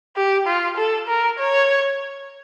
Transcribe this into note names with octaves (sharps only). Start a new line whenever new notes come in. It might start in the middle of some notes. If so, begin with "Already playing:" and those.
G4
F4
A4
A#4
C#5